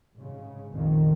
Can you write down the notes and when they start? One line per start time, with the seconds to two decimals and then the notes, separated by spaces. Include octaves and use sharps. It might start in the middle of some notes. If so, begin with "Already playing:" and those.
0.13 G#2 C#3
0.71 A#1 F2 D#3